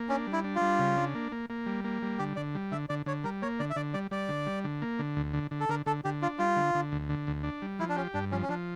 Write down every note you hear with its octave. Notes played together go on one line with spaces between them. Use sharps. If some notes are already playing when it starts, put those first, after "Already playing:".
Already playing: A#3
C#4 D4
G3
E4
D4
F4
G3
C#3
D4
A#3
A#3
A#3
G3
A#3
G3
D3 G4
D3 D5
G3
D3 E5
D3 D5
D3 C#5
G3 A#4
A#3 C#5
D3 D5
E5
D3 D5
G3 D5
G3 D5
D3
G3
D3
A#3
D3
D2
D3
D3
A4
D3 A#4
D3 A4
D3 G4
D4 F4
G3 F4
D3
D3
D2
D3
D2
D4
G3
F3 E4
D4
C#4 G4
G2 D4
F3 C#4
C#4
F3 D4